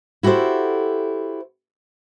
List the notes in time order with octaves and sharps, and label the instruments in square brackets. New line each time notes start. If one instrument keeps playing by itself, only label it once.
[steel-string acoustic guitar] E4 F#4 G4 A4 C5